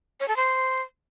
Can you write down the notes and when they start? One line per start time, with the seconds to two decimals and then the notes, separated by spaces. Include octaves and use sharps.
0.20 C#5
0.28 A4
0.36 C5